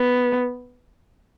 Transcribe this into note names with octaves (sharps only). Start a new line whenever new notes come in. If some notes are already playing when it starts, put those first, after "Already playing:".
Already playing: B3